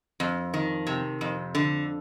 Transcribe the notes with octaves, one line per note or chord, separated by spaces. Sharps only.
F2
D#3
C3
F2
D3